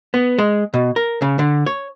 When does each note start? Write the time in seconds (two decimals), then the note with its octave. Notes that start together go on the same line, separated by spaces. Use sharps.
0.14 B3
0.38 G#3
0.74 B2
0.96 A#4
1.22 C#3
1.39 D3
1.66 C#5